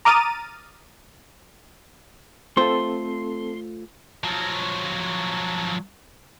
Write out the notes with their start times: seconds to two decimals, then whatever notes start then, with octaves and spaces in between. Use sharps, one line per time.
0.05 A#5 D6 D#6 F6 A6 D#7
2.57 A3 C4 F4 A4 C5 C6
4.24 F3 F#3